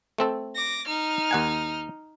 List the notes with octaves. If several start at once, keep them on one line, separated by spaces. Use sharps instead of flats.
A3 C4 A4
D6 A#6
D#4 F6
D#2 F#5 G#5